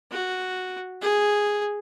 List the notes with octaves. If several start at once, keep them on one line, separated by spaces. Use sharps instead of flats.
F#4
G#4